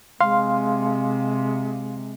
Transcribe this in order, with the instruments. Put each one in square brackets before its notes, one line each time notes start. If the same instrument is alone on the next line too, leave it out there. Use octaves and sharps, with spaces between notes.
[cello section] C3 [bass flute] G#3 [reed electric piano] F5 C6